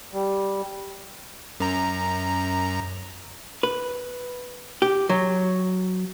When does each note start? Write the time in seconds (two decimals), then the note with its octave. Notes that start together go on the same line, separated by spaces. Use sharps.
0.13 G3
1.60 F#2 A#5
3.63 B4
4.82 G4
5.09 F#3